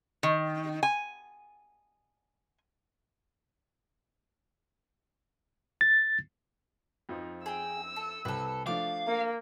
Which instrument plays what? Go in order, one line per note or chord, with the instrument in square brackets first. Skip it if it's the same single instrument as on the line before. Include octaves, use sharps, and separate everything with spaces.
[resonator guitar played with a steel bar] D#3
G#5
[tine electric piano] A6
[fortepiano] F2 F3 D#4
[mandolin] G#4 G5 [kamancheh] E6
[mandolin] A4
[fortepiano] C2 [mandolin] A4 B4
[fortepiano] F3 A3 D4 [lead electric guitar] F5 [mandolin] D6
[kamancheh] A#3